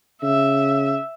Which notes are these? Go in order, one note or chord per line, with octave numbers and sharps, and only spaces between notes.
C#3 E5